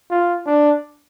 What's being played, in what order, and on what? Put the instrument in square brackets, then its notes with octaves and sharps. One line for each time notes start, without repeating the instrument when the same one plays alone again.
[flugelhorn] F4
D4